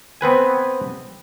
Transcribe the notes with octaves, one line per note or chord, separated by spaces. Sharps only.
B3 C4 B4 G#5